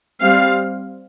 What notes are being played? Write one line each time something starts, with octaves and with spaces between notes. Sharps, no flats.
G3 C4 F5